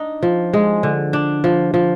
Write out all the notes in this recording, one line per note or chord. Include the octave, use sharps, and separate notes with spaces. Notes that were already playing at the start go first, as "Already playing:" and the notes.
Already playing: D4 D#4
F3
G#3
D3
D4
F3
F3